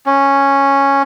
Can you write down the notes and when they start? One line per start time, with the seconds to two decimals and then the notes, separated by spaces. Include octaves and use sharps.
0.06 C#4